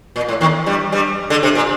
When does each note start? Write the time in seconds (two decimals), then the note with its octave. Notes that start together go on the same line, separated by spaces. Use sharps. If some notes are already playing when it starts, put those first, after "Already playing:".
0.16 A#2
0.28 A2
0.41 D#2 D#3
0.66 G2 G3
0.92 G2 G3
1.30 D3
1.43 C3
1.55 A#2